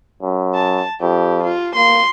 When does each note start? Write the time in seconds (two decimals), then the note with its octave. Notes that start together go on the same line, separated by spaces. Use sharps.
0.22 F#2
0.55 A5
1.01 F2 G4
1.44 F4
1.76 A#3 C6